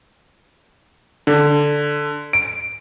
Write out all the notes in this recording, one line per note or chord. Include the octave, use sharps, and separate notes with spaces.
D3
D7